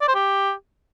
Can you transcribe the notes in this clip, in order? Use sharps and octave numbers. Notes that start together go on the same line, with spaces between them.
D5
C5
G4